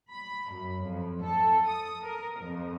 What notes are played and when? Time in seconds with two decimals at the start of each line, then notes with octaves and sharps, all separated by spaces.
0.11 B5
0.52 F#2
0.84 F2
1.23 A4
1.68 D#6
2.04 A#4
2.39 F2